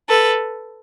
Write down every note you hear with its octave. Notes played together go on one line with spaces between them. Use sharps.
A4 B4